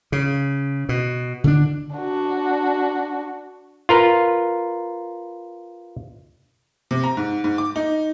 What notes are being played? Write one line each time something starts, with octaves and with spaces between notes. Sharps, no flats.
C#3
B2
D3 C#4 D4
D4 F#4
F4 A#4 B4
C3
A#5
G#2
G#2
D6
D#4